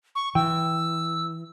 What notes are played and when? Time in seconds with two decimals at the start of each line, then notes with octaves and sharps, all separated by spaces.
0.15 C#6
0.35 E3 G5 E6